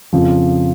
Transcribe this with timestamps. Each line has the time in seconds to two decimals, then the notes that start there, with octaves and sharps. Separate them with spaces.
0.13 F2 C#3 F3